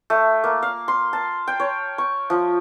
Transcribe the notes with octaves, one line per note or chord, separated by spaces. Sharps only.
A3
A#3
F5
C6
A5
G5
C#5
C#6
F3